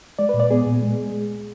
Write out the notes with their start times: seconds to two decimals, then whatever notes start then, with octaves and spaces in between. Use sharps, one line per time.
0.19 G#3 D5
0.29 A#2 B4
0.40 D5
0.50 B3 G#4
0.67 A#2
0.83 G#3